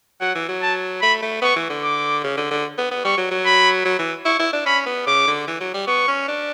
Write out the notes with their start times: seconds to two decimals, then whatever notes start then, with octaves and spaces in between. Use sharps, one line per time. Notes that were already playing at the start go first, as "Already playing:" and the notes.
0.21 F#3 F#5
0.35 E3
0.49 F#3
0.62 A5
1.02 A3 B5
1.22 A3
1.42 B3 C#6
1.56 E3
1.70 D3
1.84 D6
2.24 C#3
2.37 D3
2.51 D3
2.78 B3
2.91 B3
3.05 G3 C#6
3.18 F#3
3.31 F#3
3.46 B5
3.85 F#3
3.99 E3
4.26 E4 C#6
4.39 E4
4.53 D4
4.66 C#4 B5
4.86 B3
5.07 C#3 D6
5.27 D3
5.48 E3
5.61 F#3
5.74 G3
5.87 B3 C#6
6.08 C#4
6.28 D4